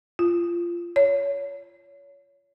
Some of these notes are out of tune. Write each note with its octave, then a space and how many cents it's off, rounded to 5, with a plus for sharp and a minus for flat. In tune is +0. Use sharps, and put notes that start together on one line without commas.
F4 -20
C#5 +25